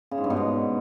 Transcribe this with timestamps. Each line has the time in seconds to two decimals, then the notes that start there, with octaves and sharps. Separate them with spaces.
0.11 C#3
0.18 G#2
0.24 G2
0.30 B2
0.36 G#2